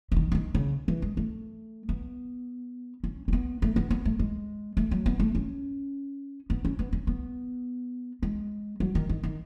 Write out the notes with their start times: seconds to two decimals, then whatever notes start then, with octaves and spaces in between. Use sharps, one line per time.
0.12 C#3
0.16 D#3
0.32 C#3
0.35 D#3
0.55 C#3
0.88 E3
1.02 G#3
1.17 A3
1.89 B3
3.04 C#4
3.28 C#4
3.33 B3
3.62 A3
3.76 B3
3.91 B3
4.05 A3
4.19 G#3
4.77 A3
4.91 F#3
5.06 B3
5.20 A3
5.35 C#4
6.50 B3
6.65 C#4
6.79 B3
6.93 C#4
7.07 B3
8.23 G#3
8.80 F#3
8.95 D#3
9.09 D#3
9.23 D#3